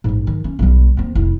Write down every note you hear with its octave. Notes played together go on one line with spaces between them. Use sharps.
A1 G#2
D#3
C#4
B1 G3
D#2 C4
F1 E4